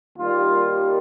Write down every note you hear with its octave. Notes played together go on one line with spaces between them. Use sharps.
D#2 D#3 G3 F4